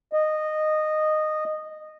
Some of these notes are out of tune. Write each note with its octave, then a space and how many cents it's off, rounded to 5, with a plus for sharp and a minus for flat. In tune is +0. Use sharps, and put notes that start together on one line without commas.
D#5 -15